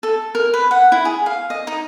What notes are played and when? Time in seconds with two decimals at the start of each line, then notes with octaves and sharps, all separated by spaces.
0.03 A4
0.35 A#4
0.54 B4
0.71 F#5
0.92 E4
1.05 G#4
1.26 F5
1.50 D#5
1.67 D#4